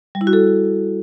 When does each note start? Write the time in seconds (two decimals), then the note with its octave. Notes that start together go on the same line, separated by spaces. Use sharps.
0.15 G3
0.21 E4
0.27 F#4
0.33 A4